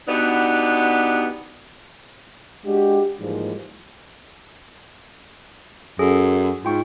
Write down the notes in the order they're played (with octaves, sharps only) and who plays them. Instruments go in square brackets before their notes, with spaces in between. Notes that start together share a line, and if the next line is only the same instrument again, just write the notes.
[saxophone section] B2 B3 D4 D#4 G4
[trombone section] G#3 D4 F#4 G4
G#2 E3 F3 G3 G#3 A#3
[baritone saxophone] F#2 [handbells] G#4 A4
[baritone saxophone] G#2 [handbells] F4 G5 C#6